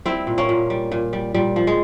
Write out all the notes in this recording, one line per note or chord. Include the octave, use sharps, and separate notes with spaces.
G3 C4 E4
A#2
A#3 C#4
A#2
G3
A#2
G3
A#2 G3
F3
G#3